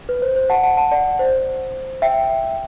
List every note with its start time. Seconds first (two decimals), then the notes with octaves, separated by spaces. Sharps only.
0.09 B4
0.22 C5
0.36 C5
0.50 F#5 A5
0.63 F#5 A5
0.77 F#5 A5
0.91 D5 F#5
1.19 C5
2.02 E5 G5